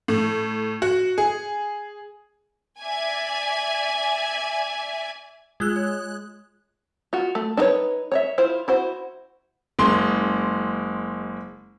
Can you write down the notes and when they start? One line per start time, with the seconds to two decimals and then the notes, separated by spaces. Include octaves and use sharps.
0.08 A2
0.82 F#4
1.18 G#4
2.81 D5 E5 G#5
5.60 G#3 F4 G#4 E6 F#6
5.76 C#5
7.13 F4 F#4
7.35 A3
7.57 D4 D#4 F4 B4 C#5
8.12 C#5 D5 E5
8.38 E4 F4 C5
8.68 E4 F#4 C5
9.79 F#1 G#3 C6